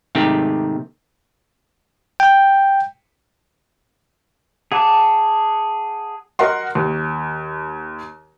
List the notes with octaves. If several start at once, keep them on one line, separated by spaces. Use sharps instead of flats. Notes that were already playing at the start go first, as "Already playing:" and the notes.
G#2 C3 D#3 A3 C4 G4
G5
G#4 F#5 A5 D6
F#4 A#4 D#5 F#5 C6
D#2